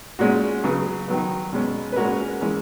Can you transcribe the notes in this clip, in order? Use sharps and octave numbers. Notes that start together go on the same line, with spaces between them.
A#2 G#3 C#4 F#4
C#3 F#3 B3
D#3 F#3 B3
B2 G#3 C#4
B4
A#2 G#3 C#4 F#4 A#4
E3 G#3 C#4